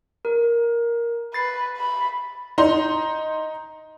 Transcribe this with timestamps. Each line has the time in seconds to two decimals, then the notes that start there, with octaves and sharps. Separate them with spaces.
0.25 A#4
1.34 B4 A6 C7
1.77 B5
2.58 D#4 A#5 C6